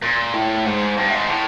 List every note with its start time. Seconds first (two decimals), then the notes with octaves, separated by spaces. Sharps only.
0.02 A#2
0.34 A2
0.65 G#2
0.97 G2
1.08 A2
1.12 G#2
1.29 A2